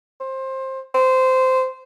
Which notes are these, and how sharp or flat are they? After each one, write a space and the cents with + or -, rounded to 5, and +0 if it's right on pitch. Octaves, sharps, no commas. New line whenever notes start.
C5 +20
C5 -15